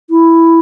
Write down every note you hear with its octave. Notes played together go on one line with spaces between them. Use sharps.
E4